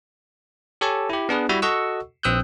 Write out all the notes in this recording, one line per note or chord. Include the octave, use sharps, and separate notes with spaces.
G4 A4 C#5 G#5 A5
E4 G4
B3 D4 G#4 B4
G3 E4 F#4 E5
F#4 A4 D#5 F#5 C#6 E6
A#1 C4 D#6 E6 F#6 G6